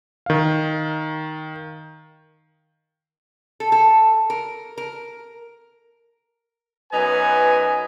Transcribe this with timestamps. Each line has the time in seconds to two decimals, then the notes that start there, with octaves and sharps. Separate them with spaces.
0.26 D#3 F5
3.60 A4
3.72 A4
4.30 A#4
4.78 A#4
6.93 F#2 B3 D#4 B4 G#5